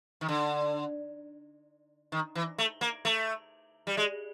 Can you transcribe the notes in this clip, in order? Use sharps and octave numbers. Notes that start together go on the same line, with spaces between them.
D#3
D3
D#3
E3
A3
A#3
A3
G3
G#3